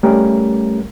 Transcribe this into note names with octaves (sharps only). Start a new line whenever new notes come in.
G3 A3 C#4 A#4